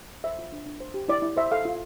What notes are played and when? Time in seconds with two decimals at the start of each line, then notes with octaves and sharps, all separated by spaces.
0.24 C5 E5
0.39 F4
0.52 D4
0.66 D4
0.80 C5
0.94 G4
1.08 E4 D5
1.22 E4
1.37 C5 E5
1.51 A4 F5
1.65 F4